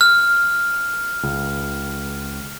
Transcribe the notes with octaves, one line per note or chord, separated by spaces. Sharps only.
F6
C#2